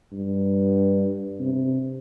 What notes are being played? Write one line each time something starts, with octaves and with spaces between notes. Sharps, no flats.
G2
C3